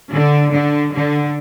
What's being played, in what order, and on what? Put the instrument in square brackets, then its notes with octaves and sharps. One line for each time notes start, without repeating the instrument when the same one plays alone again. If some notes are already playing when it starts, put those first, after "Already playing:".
[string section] D3
D3
D3